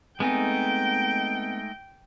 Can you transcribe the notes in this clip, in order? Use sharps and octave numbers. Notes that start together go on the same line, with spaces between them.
G#3 A3 B3 C4 D#4 G5 G#5